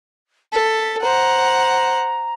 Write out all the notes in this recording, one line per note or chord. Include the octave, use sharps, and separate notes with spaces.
A4 B6
C5 F#5 A#5